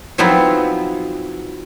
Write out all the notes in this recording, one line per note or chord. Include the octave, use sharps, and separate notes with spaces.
F3 F#3 B3 C4 D#4 E4